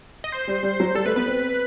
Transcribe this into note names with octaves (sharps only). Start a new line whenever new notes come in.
D#5
C5
G3
G3
F#3
G3 A4
A3 B4
B3 B4
C4